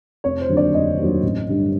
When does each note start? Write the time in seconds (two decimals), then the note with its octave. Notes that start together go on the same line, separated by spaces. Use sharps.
0.24 F1 C#5
0.41 C5
0.49 D#2 D3 F#3
0.57 D5
0.73 F1 D#5
0.99 D#2 D3 F#3
1.23 A1
1.49 G2 D3 G3